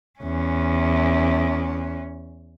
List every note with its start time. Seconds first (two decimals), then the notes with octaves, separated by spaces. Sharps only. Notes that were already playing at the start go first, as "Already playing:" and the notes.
0.19 E2 C#4